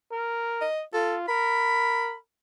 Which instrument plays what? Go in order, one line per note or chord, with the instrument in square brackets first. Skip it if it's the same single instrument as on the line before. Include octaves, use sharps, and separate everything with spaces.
[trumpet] A#4
[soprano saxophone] D#5
[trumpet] F4 [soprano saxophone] A4
[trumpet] A#4 [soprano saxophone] B5